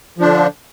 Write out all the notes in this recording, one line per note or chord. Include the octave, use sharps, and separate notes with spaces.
D3 F3 D4